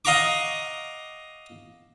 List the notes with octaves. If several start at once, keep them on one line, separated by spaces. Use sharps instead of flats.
D#5 F5 F#5 A#5 C#6 D6